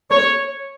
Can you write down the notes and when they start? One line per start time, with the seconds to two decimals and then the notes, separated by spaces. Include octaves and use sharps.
0.11 C#5